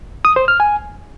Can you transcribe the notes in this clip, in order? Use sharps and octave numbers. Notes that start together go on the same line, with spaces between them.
D#6
C5
F6
G#5